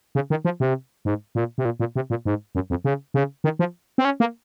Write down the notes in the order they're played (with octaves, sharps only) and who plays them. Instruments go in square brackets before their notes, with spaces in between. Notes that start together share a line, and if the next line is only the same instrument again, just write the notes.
[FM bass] C#3
D#3
F3
C3
G#2
A#2
C3
A#2
A#2
C3
A#2
G#2
F#2
F2
C#3
C#3
D#3
F3
C4
C#4
A#3